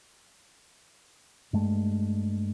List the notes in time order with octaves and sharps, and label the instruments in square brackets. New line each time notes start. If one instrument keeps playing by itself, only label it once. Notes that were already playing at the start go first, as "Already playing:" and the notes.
[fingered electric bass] G2 G#3 A3